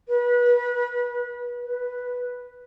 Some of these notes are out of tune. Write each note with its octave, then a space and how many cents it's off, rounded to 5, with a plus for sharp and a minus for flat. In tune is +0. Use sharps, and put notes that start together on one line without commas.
B4 -30
B4 -5